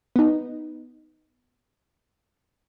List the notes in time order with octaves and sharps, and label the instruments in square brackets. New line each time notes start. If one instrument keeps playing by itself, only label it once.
[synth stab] B3 D#4